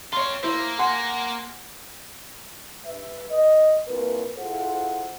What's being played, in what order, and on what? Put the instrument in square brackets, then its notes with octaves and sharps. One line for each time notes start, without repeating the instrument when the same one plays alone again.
[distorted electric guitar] C4 F4 [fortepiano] C#5 C6
[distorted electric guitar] A#3 [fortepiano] E4 C5
[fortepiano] F#5 G#5 C6
[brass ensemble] G2 B4 E5
D#5
C2 A#2 A#4 B4
E4 F4 G#4 A4 C5 F#5